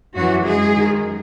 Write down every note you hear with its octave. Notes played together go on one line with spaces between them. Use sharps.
F#2 E3 F#3 F#4
G#3 G#4
F#2 D#3